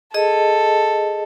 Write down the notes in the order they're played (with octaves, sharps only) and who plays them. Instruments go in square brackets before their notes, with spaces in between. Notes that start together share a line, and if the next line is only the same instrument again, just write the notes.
[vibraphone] G#4 D#5 [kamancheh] A4